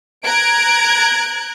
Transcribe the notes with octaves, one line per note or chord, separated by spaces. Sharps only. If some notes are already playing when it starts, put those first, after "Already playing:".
A#5 F#6 G#6 D7